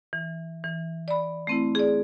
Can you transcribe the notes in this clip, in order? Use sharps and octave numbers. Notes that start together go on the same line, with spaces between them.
E3
E3
D5 B5
A3 C4 E4
G#4 D5